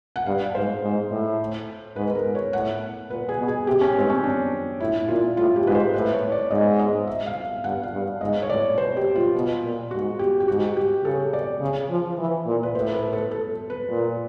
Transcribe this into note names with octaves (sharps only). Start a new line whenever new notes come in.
F#5
G2 F5
G#2 C5
G#2
A2
G#2 B4
B4
A#4
G#2
C#5
A2 F#5
A#2 B4
G#4
B2
G#4
C3 G4
C#4
G#2 C4
C#4
D4
A2 E4
A#2 F4
A2 F4
G4
G#2 B4
C5
A2 B4
C#5
D5
G#2 D#5
D#5
E5
F5
F5
G2 F#5
F5
G2
G#2 D#5
C#5
A2 D5
B2 C5
G4
F4
B2
A#2
G#2 F#4
G4
G4
G#2 F#4
G4
C#3 A4
D5
C#3
F3
E3
A#2
B4
A2 C5
B4
A4
A4
B4
A#2